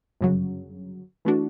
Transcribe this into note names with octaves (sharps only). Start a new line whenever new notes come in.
G1 F#2 C#3 F#3
E3 A3 D4 F#4